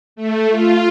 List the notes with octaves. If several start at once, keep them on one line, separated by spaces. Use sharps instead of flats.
A3
F4